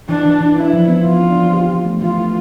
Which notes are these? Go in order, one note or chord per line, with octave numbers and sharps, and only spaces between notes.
E3 D4
E3
E3
D4 E4
F3
B3
F3 F4
D4
F3
G4
E3
A3
E3 F4
A3